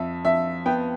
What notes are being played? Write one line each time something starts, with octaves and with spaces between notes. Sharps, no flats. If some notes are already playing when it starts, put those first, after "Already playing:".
Already playing: F2 E5
F2 E5
B3 G5